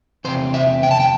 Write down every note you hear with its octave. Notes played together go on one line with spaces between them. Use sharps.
E2 C3 C4 C5
E5
G5
A5
G5